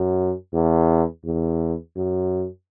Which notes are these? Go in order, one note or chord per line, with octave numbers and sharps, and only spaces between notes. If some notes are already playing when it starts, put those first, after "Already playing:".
Already playing: F#2
E2
E2
F#2